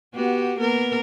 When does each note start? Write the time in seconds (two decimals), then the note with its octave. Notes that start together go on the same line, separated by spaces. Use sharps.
0.15 B3 F#4 G4
0.58 A#3 B3 A#4